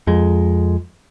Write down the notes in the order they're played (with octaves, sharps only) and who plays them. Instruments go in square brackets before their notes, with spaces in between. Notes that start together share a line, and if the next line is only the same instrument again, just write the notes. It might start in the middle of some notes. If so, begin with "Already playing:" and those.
[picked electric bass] F2 G#3